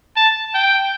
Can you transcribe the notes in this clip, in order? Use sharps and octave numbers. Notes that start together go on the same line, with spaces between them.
A5
G5